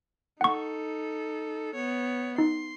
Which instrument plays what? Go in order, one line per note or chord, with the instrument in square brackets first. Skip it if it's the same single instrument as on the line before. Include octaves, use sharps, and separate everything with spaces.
[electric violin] D#4 A4 [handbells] F#5 C#6
[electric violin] B3 C#5
[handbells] D#4 [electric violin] C6